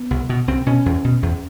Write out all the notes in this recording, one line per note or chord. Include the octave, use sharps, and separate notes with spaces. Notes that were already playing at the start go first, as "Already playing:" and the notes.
Already playing: B3
C2
B2
C2 C4
B2 C#4
E2
B2
E2